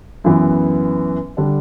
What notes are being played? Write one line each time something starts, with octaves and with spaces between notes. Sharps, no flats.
F#2 E3 B3
D3 G3 D4